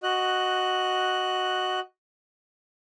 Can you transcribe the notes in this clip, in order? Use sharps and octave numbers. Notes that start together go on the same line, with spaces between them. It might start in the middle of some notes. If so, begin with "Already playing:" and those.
F#4 D#5 F#6